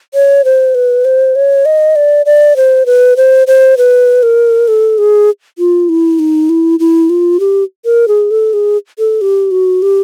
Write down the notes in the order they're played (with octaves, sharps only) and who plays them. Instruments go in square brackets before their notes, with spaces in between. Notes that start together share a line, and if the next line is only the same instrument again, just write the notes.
[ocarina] C#5
C5
B4
C5
C#5
D#5
D5
D5
C5
B4
C5
C5
B4
A#4
A4
G#4
F4
E4
D#4
E4
E4
F4
G4
A#4
G#4
A4
G#4
A4
G4
F#4
G4